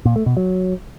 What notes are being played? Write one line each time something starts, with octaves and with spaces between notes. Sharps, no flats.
A#2
A3
B2
F#3